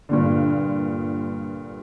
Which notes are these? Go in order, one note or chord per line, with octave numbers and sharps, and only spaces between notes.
G2 A#2 D3